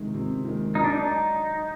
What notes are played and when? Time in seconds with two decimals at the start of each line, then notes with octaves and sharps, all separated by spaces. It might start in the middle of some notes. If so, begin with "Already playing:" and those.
Already playing: C3 D#3 G#3
0.14 C3
0.45 D#3 G#3
0.75 F#3 D#4
0.84 D4
0.94 D#4